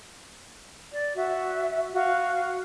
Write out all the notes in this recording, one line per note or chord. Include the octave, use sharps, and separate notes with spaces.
D5
F#4 E5
F#4 F5